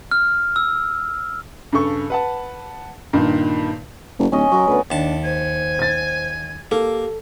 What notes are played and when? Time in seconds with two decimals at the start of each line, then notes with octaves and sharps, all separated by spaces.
0.11 F6
0.56 E6
1.73 G2 C#3 A4 C#6
2.10 B4 F#5 A5
3.13 G2 A#2 D#3
4.19 F#1
4.32 D1 C#4 C#5 D#5
4.52 F#3 A#4 C#5
4.67 D2 B3 B4
4.91 D#2 D4 A5
5.24 C5 G#5
5.79 G#6 A6
6.71 A#3 G4 A4